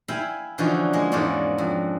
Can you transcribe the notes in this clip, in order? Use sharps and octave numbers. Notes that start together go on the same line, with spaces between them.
E4 E5 F5 G5 G#5 B5
D3 E3 F3 C#4 D#4 F#4
G#3 A#3
E2 G#2 E3 A#3 C#4 D4
F2